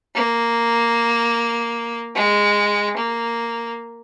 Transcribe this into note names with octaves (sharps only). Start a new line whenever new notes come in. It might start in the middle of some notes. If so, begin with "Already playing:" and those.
A#3
G#3
A#3